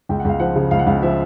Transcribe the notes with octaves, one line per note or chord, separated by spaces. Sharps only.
C#2 G5
F#5
C#2 F5
F3 F#5
C#3
C#2 F5
F#5
C#2 F5
F3 E5